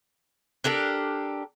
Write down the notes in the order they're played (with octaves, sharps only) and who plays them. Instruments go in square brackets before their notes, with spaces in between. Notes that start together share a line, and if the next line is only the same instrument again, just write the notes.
[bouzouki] D4 G4 A4 A#4